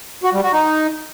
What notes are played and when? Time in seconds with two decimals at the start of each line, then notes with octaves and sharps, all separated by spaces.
0.24 F#4
0.33 G3
0.43 F#4
0.53 D#4